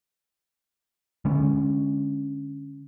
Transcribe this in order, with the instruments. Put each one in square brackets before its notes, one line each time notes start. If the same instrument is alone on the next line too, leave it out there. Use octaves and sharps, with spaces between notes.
[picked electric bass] D3 G#3 C#4